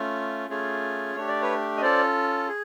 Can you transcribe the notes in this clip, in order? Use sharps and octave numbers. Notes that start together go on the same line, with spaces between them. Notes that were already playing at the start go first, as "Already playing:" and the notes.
Already playing: A3 C#4 F4
A3 C#4 F4 G#4
A3 D4 G4 C#5
D5
B4 C#5
D#5
C#4 F4 A4 C5 D5
G#4